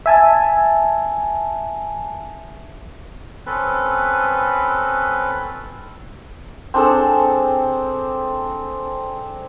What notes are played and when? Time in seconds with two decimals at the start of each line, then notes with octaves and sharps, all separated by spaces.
0.06 E5 G#5 A5
3.46 C4 C#4 A4 B4
6.74 C4 D4 G#4 A4